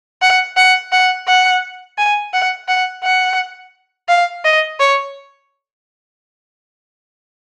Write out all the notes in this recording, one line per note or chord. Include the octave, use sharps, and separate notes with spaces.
F#5
F#5
F#5
F#5
G#5
F#5
F#5
F#5
F5
D#5
C#5